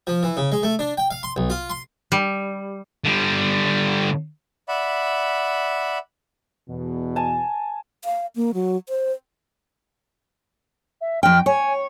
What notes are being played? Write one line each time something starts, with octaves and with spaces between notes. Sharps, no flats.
F3
E3
C#3
G#3
A3
D4
G5
F5
C6
B1
F4
C6
G3
D3 G3
D5 E5 F#5 B5
E2 B2
G#5 A5
F5
A#3
F#3
C5
E5
F2 G5 F6
C#5 G#5